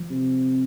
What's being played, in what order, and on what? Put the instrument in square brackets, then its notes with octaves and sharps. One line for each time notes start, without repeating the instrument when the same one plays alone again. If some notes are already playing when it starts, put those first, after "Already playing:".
Already playing: [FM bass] F3
[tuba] C3